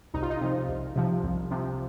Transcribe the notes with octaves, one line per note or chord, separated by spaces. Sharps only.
C2 D#4
F4
D#4
C3 F3
C2
C3 F3
C2
C3 F3